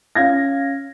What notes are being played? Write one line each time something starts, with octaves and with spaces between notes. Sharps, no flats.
C#4 F5 G#6 A#6